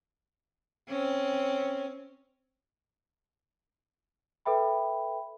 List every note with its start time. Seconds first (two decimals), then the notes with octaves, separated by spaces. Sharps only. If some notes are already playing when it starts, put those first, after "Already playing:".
0.88 C4 C#4
4.45 A4 B4 E5 G5 B5